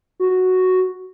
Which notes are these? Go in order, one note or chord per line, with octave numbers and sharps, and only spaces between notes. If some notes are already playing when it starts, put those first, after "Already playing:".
F#4